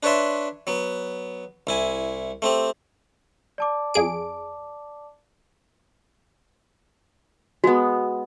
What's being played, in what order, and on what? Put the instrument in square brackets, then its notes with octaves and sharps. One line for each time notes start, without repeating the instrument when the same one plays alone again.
[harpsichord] D4 B4 C#5 D5 E5 C6
F#3 B3
C2 E4 G#5
A3 C4 G4
[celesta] D5 A5 D6
[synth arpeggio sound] F2 G#4 D7
[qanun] G#3 B3 [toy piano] F#4